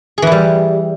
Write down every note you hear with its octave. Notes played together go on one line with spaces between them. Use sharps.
E3 G3 E4 G#4